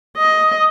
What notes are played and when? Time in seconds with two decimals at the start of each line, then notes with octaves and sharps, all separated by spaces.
0.17 D#5